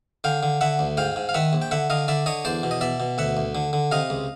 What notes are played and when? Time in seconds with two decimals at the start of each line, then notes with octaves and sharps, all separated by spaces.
0.24 D3 F5 G5
0.43 D3
0.61 D3 E5 F#5
0.79 D2
0.97 G#2 F5 G5
1.16 G#2
1.29 F5
1.34 D#3 E5 F#5
1.53 A#1
1.62 G5
1.71 D3 E5 F#5
1.90 D3 D#5 F5
2.08 D3 D5 E5
2.26 D3 C#5 D#5
2.45 E2 C5 D5
2.63 B2
2.71 D#5
2.81 B2 D5 E5
3.00 B2
3.18 D2 E5 F#5
3.37 D2
3.55 D3
3.73 D3
3.91 C3 D#5 F5
4.10 C#2